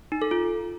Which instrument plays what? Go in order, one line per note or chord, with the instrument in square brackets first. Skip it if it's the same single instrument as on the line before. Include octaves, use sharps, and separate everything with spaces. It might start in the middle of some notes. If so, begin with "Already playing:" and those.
[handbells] D#4
A4
F4